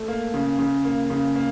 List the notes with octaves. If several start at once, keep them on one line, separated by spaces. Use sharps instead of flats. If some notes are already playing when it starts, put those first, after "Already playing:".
Already playing: A3
A#3
C#3
C#3
A#3
C#3
A#3